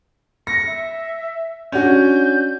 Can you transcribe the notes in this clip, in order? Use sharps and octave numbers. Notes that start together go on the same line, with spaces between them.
A#6 C#7
E5
C#4 D4 F#4 G6